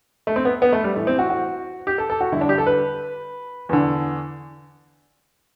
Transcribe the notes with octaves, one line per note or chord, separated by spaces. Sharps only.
A3
C4
B3
B3
A3
G3
A2 E3 A3
C4
F#4
F#4
G4
A4
A4
F#4
G2 D3 E4
D4
G4
A4
B4
E2 D3